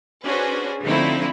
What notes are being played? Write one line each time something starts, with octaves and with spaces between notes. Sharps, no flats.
C#4 D4 F#4 G#4 B4 C5
D3 F3 A3 C4 D#4 E4